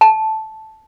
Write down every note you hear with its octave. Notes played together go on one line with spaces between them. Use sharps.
A5